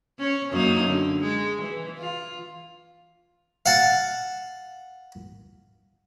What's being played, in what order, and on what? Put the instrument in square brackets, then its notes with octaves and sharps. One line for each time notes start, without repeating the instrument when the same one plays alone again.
[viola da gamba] C#4 C#5
F#2 A#3 D#4
D3
G#3
E3
F4
[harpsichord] F5 F#5 A5